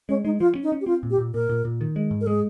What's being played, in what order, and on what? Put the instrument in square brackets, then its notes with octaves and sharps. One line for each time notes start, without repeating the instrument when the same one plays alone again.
[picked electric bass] G#3 [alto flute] C#4
[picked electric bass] G#3 [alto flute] D#4
[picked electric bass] F3 [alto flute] F4
[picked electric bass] C#4
[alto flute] D#4
[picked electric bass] C#4
[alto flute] G4
[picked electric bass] C4 [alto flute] F4
[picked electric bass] A#2
[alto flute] G4
[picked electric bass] A#2
[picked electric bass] A#2 [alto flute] A#4
[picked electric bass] A#2
A#2
D#3
G#3
G#2
[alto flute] A#4
[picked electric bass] G#3 [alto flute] G#4